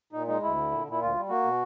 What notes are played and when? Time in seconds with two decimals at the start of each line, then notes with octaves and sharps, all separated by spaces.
0.12 A#2 D#4
0.28 G#3 D#4
0.42 D2 E4
0.57 D3
0.72 A#2
0.86 A#2 E4
1.01 D2 F4
1.15 G3
1.29 A#3 F#4
1.43 B2